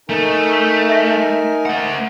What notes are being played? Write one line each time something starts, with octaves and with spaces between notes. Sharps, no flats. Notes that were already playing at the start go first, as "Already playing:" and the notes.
A3 D#4 A#4 G#5
E5 A#6
A3 F#5